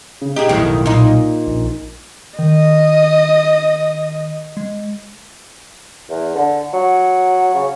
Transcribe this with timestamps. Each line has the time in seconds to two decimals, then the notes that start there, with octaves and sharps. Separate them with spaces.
0.21 C#3
0.36 D#4 G4 G#4
0.49 B1 F2 A2 D#3
0.86 A#2 D#4
1.47 A#1
2.39 D#3 D#5
4.57 G#3
6.10 E2
6.35 D3
6.73 F#3
7.54 C#3